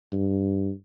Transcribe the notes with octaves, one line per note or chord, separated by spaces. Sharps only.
G2